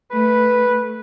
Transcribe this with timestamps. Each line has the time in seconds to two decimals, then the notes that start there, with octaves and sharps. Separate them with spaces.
0.11 A3 B4